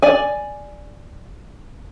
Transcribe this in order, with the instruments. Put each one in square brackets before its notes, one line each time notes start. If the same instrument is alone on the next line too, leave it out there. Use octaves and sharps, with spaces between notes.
[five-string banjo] D5 G#5